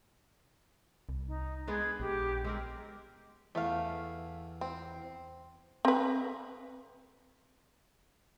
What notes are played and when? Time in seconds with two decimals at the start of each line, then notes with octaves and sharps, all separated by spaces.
1.09 C2
1.28 D#4
1.67 G#3 B3 D4 G#4
2.00 A#1 G4
2.44 G#3 C4 A#4
3.55 E2 A3 F5
4.61 C4
5.85 C4 B4